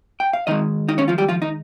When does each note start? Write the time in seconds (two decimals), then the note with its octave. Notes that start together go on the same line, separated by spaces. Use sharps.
0.20 G5
0.33 F5
0.47 D#3 G#3 D#4 D#5
0.89 D#4 D#5
0.98 C#4 C#5
1.08 F3 F4
1.18 G3 G4
1.29 F3 F4
1.42 D#4